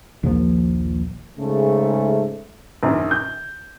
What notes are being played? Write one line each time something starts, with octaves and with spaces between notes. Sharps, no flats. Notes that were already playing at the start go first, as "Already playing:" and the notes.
A#1 D#2 F3 A#3
G#2 C#3 A3
A#1 F#2 D#3
G6